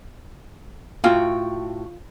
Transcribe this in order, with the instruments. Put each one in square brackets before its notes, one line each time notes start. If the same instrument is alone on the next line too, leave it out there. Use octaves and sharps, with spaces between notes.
[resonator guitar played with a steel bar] A2 F#4 G5 [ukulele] F4